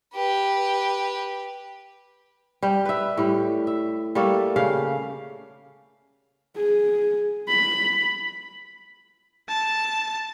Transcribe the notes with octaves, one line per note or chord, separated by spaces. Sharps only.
G4 B4
G3 G4
B4 E5
A2 G3
E5
G3 A3 A#3 A4
C#3 G4 F5
G#4
B5
A5